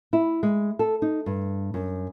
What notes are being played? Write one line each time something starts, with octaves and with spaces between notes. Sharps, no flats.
E4
G#3
A4
D#4
G2
F#2